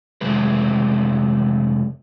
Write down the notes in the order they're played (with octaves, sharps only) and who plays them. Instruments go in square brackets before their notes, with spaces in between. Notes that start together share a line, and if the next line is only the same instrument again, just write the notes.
[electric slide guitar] F2 C3 G#3 A3 B4